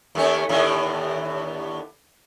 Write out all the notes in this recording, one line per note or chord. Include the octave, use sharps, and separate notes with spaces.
D#2 A3 C#4
D#2 A2 D3